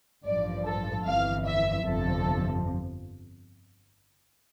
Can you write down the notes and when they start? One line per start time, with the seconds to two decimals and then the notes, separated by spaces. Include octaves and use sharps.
0.24 A1 G2 F3 D5
0.65 A4
1.06 G1 F2 E3 F5
1.47 E5
1.87 G1 F2 C3 F3 A4